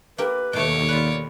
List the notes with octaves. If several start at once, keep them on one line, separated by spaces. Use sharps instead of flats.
A#3 G4 A#4 B4
D#2 B2 A3 C#5 D6
F4 B4 D5